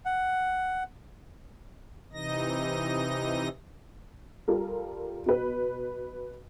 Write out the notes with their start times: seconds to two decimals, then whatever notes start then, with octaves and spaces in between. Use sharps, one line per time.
0.05 F#5
2.13 C3 E3 D#4 D#5 A#6
4.48 G3 F4 A4 A#4
5.26 B2 B4